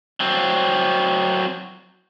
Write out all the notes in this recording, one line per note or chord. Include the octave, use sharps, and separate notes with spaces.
F#3 C4